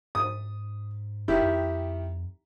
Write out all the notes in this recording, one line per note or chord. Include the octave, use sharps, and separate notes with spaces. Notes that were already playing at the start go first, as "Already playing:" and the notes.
G#2 D#6
F#1 D#3 E4 G4
F2